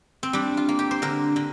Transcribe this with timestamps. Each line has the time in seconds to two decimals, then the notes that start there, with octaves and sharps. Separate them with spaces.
0.23 C4
0.33 G3 D4
0.57 F4
0.69 A#3
0.79 G4
0.91 C5
1.02 D3 A#4
1.36 D3